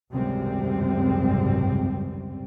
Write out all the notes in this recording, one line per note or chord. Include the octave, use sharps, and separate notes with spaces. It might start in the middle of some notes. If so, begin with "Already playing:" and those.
G#1 C#2 F#2 C3 G3 C4